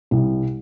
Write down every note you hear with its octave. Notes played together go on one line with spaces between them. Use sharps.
C2